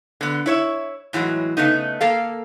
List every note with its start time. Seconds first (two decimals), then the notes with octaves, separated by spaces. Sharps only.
0.21 D3 B3
0.46 E4 C#5 E5
1.13 A2 E3 F#3 G#3
1.57 C#3 A3 B3 D#4
2.01 A#3 A4 F5